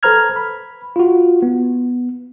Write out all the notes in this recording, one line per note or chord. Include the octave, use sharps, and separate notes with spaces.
A4 B4 C5 A#5 F6 G#6
B5
F4 F#4
B3